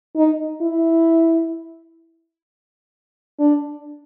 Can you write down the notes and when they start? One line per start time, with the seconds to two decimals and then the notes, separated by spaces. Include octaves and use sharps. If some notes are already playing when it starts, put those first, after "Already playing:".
0.16 D#4
0.62 E4
3.39 D4